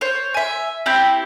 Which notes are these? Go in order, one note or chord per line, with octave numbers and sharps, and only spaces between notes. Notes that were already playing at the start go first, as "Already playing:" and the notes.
C5 C#5
E5 G#5
C4 E4 G4 G6